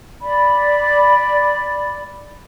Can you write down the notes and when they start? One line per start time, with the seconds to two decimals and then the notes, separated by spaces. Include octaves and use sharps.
0.22 D5 B5